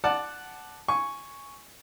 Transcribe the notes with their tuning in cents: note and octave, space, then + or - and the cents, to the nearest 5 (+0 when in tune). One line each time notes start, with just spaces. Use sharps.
D5 +10 F#5 +0 A5 -10
G#5 +0 C#6 +0